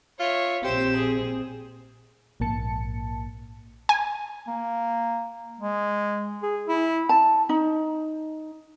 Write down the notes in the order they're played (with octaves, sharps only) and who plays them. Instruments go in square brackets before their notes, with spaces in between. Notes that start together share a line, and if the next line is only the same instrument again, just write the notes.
[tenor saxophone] F4 [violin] C#5 E5
[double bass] A#1 C4 [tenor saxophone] G4 [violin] C5 E7
[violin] G#4
[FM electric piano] A#1 G#2 A#3 A5 C#7
[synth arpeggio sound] G#5
[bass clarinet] A#3
G#3
G#4
E4
[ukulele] A5
D#4